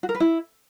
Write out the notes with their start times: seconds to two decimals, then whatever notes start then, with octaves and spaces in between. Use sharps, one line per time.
0.03 F#4
0.09 A#4
0.15 B4
0.20 E4